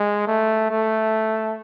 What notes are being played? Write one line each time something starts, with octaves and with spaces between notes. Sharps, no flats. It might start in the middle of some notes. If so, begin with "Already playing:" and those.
Already playing: G#3
A3
A3